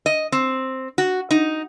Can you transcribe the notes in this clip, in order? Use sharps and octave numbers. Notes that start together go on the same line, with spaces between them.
D#5
C4
F#4
D#4